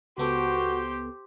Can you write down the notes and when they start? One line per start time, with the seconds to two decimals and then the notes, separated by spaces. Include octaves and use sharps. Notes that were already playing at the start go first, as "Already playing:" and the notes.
0.18 C#2 B3 F#4 G4 A4 C5